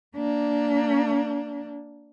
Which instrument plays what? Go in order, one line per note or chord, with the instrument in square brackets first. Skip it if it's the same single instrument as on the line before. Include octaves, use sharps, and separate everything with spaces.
[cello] A#3 D4